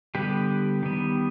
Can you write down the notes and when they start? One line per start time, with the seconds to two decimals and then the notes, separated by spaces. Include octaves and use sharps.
0.15 D3 G3 B3 G4 B4
0.83 D#3 G3 B3